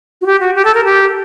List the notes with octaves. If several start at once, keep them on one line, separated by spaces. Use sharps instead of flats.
F#4
G4
F#4
G4
A4
A#4
G4